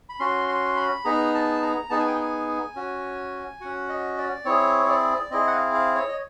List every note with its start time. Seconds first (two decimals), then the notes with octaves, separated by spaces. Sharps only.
0.09 B5
0.19 C#4 F#4 C6
0.48 C6
0.77 B5
1.05 B3 D#4 G#4 A#5
1.34 A5
1.62 A#5
1.90 B3 D#4 G#4 A5
1.99 G#5
2.07 G5
2.16 G#5
2.76 C#4 F#4
3.61 C#4 F#4 F#5
3.89 D#5
4.18 D5
4.45 C4 E4 G#4 C#5
4.89 D5
5.31 C4 E4 G#4 D#5
5.47 F#5
5.53 F5
5.74 F5
5.95 C#5
6.09 D#5